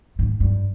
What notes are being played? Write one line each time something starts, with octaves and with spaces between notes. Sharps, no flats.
G#2
G2